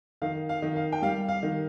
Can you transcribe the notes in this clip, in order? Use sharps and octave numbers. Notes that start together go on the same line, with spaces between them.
D#3 F5
F5
D#3
F5
G5
G3 F5
F5
D#3